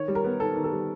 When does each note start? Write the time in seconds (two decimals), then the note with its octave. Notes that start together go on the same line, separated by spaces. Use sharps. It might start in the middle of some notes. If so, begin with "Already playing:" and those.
Already playing: D#3 C#5
0.08 G3
0.15 A#4
0.24 B3
0.40 D#3 A4
0.55 D#3
0.64 A4
0.72 G3